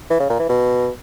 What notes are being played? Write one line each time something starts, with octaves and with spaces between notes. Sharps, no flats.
E3
C#3
A#2
E3
B2